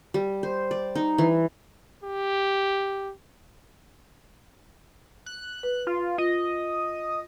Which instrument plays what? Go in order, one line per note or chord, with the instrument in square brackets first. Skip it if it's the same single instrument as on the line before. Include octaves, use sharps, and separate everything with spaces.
[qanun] G3
C5
D5
D#4
E3
[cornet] G4
[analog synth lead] F#6
[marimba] B4
[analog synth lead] F4
[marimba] F4 [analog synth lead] D#5